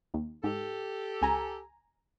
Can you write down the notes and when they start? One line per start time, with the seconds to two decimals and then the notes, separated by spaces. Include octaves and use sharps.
0.14 D#2
0.44 G#2 G4 A4
1.22 C#2 G#5 A#5